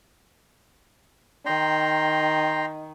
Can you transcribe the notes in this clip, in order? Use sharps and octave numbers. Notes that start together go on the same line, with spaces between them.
D#3 G5 A#5 C6